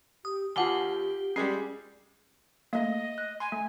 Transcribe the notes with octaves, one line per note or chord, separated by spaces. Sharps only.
G4 D#6
D#2 F4 G4 F#5 G#5 A5 D6 G7
G3 G#3 C#4 G#4
A3 A#3 D#5
F#6
G#5 C6
A3